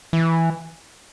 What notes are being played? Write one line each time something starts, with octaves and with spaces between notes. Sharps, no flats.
E3